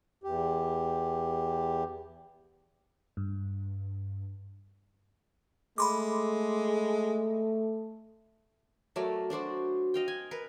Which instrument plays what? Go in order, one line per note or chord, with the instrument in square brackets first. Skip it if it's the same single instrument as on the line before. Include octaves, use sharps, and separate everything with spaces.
[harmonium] E2 G4
[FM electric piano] G2
[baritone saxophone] G#3 [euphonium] A3 [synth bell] B5 C6 D6
[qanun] F#3 A3 A#4 D5
D4 F#4 C5 D5
D#5 F5 G5
G#5
A#4 B4